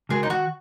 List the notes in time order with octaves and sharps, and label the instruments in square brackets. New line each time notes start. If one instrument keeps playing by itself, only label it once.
[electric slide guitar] C#3 G#3 F#4 A#4 [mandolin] G#4
[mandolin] D#4
[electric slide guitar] D#3 [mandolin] F#4